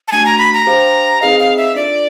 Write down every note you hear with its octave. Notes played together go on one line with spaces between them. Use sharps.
A5
A3 D4 F#4 G#5
A#5
B5
A#5
D4 G4 C5 F5
C4 D#4 G#4 B4 D#5 F5
F5
E5
D4 F4 A4 D5